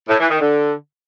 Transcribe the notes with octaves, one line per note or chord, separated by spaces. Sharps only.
A2
E3
D#3
D3